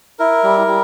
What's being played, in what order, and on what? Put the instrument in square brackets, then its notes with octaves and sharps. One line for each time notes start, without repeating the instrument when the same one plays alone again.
[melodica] E4 A#4
G3
G3